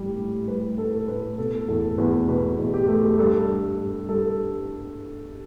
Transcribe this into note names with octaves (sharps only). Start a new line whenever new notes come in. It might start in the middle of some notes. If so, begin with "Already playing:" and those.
Already playing: A2 G3
A2
G3 B4
A2 A4
A2 B4
B2 A4
E2 A4
E2 B4
B2 B4
E2
G4
A3
G2 A4
G2
G2
G2 A4